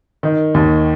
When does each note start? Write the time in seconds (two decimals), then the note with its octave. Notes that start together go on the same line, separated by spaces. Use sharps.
0.23 D#3
0.54 D#2